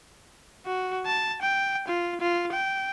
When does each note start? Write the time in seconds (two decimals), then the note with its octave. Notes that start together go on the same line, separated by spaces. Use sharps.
0.66 F#4
1.06 A5
1.42 G5
1.88 F4
2.21 F4
2.53 G5